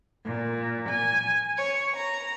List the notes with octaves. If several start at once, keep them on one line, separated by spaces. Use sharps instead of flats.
A#2
G#5
C#5
A#5